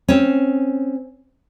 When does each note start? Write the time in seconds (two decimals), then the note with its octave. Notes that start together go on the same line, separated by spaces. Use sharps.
0.08 C4 C#4